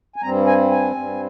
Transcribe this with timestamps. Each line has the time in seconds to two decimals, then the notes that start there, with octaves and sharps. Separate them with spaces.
0.16 G#5
0.22 G2 G3 C4 A#5
0.47 G#5
0.71 G#5
0.95 G2 G3 C4